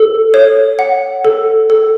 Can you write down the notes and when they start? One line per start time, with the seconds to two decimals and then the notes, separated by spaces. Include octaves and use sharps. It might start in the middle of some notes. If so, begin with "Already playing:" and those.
Already playing: A4
0.34 C#5
0.79 F#5
1.25 A4
1.70 A4